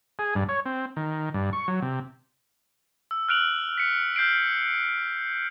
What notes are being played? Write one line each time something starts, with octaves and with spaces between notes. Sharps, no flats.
G#4
G2
C#5
C4
D#3
G2
C#6
F#3
C3
E6
F6 F#6 D7 F7 F#7
B6 C#7
F6 G6 C7 D7